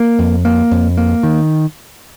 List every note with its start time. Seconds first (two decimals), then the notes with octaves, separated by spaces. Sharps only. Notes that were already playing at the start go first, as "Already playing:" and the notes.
Already playing: A#3
0.19 F2
0.45 A#3
0.71 F2
0.98 A#3
1.23 D#3